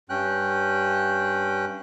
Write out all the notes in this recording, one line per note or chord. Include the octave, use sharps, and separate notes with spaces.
G2 C#4 G5 F#6